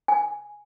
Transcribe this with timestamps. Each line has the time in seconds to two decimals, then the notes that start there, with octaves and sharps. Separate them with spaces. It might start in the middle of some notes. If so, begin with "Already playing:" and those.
0.08 G#5